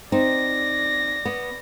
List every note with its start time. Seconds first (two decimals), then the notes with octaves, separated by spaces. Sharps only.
0.12 C4 D#4 D5 A#6
1.25 B3